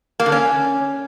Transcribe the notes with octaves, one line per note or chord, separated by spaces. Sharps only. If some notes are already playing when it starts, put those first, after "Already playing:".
A#3
D3
C#4